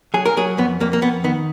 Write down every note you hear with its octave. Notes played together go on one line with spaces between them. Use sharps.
F#3 G#4
A#4
F#3 G#4
F2 B3
F2 A#3
A#3
F2 B3
D#3 B3